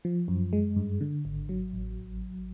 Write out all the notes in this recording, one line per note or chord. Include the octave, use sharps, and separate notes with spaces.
F3
F#2
G#3
G2
D3
G#1
F#3
A1